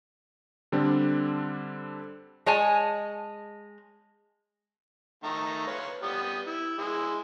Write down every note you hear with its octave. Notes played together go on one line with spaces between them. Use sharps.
D3 G3 C4 D4
G#3 C#5 G#5 A5
D#3 A3 A#5
B4 C#5 F5
G3 B3 D#6
E4
G#3 E4